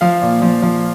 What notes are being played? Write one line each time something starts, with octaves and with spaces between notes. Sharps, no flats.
F3 F5
A#2
F3
F3